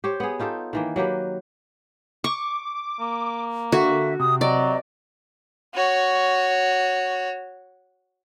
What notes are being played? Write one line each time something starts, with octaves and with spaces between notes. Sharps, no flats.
G4 C5 C#5
B3 G#4
D#4 F4 G4 A4
D#3 E3 A#3
F#3 A#3 G4 B4
C#6 D6
A#3
D3 F#4 E5
C3 D#6
F#3 D5 D#5
F#4 C#5